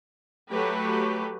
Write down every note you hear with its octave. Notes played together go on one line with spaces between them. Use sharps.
F#3 A3 G4 B4